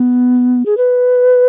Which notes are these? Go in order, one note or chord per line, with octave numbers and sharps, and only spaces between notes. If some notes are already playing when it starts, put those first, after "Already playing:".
Already playing: B3
G#4
B4